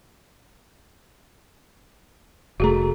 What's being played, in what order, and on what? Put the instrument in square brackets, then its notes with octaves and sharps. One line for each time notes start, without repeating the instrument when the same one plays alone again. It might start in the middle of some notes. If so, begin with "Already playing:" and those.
[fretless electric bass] F1 A3 [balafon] F#4 G#4 A#5